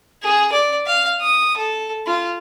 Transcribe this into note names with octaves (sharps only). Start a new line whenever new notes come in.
G#4
D5
F5
D#6
A4
F4